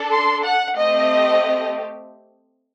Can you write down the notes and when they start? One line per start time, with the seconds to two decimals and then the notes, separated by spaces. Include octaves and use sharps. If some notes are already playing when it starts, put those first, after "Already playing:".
Already playing: D4 A4
0.11 C6
0.43 F#5
0.75 A3 C4 G4 D#5